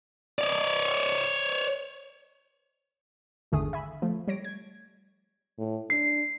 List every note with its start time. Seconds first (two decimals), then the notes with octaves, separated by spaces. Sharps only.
0.39 C#5 D5
3.52 G#1 E2 D3 A3 G#4 D#6
3.73 E5 G#5 B5
4.02 F3 A3
4.28 G3 C#5 A#6 D7
4.44 G#6
5.58 A2
5.90 D4 C7